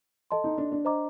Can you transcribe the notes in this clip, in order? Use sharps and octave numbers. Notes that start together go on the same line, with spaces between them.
A4 D#5 A5 C6
D#4
D4
D4
C5 D#5 A#5 D6